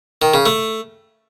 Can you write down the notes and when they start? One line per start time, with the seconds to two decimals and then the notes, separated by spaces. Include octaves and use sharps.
0.22 D#3
0.34 C#3
0.46 A3